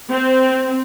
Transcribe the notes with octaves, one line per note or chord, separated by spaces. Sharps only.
C4